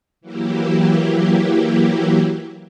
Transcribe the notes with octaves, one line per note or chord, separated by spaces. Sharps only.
E3 F#3 A#3 E4 G4